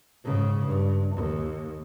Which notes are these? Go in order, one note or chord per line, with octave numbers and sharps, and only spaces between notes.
G#2 C#3
G2
D#2